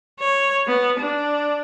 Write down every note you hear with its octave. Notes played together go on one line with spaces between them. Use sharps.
C#5
B3
D4